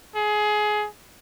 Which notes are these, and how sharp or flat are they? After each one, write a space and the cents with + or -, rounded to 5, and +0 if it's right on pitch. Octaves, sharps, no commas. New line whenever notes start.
G#4 +20